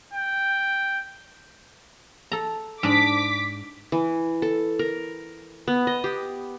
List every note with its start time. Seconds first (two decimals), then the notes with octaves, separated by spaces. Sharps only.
0.14 G5
2.32 A4 A#5
2.83 G#2 D4 D6 B6
3.92 E3
4.42 A4
4.79 A#4
5.67 B3
5.87 D#5
6.04 G4